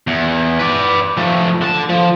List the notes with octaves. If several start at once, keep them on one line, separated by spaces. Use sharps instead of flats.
E2
B4 D5
F3 A3
D3 A5
F3